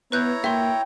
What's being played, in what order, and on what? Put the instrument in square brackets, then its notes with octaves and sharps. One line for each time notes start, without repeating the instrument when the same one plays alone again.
[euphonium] B3 [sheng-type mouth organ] E4 C#5 A#5 [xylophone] B4 F#6 G6
[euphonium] A#3 [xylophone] E5 C6 [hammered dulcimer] G5